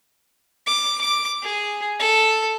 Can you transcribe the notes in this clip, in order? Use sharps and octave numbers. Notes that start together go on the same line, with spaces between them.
D6
D6
G#4
A4